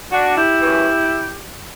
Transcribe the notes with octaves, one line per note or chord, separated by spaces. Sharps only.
D4 F#4
E4 G4
F#2 E3